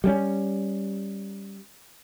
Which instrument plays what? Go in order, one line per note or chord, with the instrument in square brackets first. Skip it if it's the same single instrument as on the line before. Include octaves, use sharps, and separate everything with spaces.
[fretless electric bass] G3 G#3 C#4